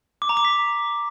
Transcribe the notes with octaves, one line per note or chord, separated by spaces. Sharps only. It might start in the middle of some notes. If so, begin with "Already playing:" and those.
D6
A#5
D6
B6